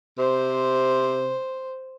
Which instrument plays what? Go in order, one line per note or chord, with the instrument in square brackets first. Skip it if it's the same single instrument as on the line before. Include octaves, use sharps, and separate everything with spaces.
[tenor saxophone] C3 [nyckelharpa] C5